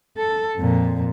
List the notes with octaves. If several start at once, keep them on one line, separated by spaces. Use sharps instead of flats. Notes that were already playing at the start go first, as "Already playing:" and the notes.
A4
F2 A#2